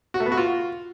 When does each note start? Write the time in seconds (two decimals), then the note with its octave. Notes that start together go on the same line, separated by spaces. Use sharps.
0.14 F#4
0.20 A3
0.26 B3
0.32 F#4
0.37 F4